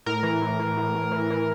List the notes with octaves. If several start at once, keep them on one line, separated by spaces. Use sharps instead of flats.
A2 A#4
E3
A2
E3
A2
A2
E3
E3